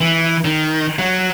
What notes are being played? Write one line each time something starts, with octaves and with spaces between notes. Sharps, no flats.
E3
D#3
F#3